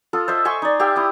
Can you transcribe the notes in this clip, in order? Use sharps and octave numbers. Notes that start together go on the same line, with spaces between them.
F4 A4 D#6
C5 D#5 E5
E5 G#5 C6 C#6
D#4 D5
G4 E5 F5 G5
E4 D#6